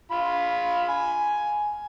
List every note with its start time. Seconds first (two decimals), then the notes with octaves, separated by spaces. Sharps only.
0.11 F4 F5 B5
0.88 G#5